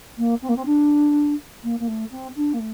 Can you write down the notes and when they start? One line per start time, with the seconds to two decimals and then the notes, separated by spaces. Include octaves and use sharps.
0.17 A#3
0.42 C4
0.49 A#3
0.56 C4
0.65 D4
1.63 A#3
1.79 A#3
1.87 A3
2.11 C4
2.36 D4
2.53 A#3
2.59 A3